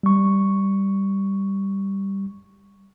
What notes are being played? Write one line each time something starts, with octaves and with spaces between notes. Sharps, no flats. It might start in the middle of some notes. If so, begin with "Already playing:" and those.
G3 C#6